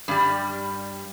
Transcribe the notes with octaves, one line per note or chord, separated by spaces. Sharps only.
G2 G3